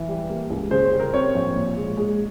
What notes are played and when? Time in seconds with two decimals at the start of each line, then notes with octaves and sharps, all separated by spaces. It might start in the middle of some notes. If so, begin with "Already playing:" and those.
Already playing: E3
0.08 G3
0.29 A#3
0.50 C#2
0.71 C#3 C5
0.85 C5
0.92 G3
1.00 A#4
1.13 C4 C#5
1.35 A#1
1.56 A#2
1.77 G#3
1.97 G#3